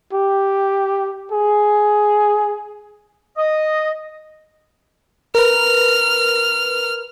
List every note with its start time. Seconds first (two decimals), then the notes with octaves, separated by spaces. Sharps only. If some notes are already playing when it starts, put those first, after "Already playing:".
0.13 G4
1.32 G#4
3.37 D#5
5.35 A#4 B4 F6